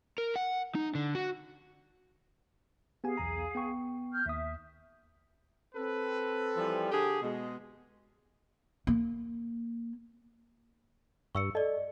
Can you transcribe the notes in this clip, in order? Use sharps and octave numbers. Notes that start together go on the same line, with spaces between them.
A#4
F#5
D#4
D3
F#4
B3 G4 G#4 F5 G#5
B1 E2 A#5
B3 G5 C#6
F6 G6
D#2 E5 D#6
C4 A4 B4
E3 F3 G3
D3 G4 G#4
B2 G#3
A#3
G2 C#6 E6 C#7
A4 D5 D#5